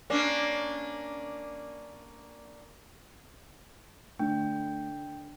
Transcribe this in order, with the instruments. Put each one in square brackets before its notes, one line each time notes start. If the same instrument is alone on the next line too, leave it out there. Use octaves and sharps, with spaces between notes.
[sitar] A#3 C#4 D4
[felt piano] D3 [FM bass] A3 [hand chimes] G5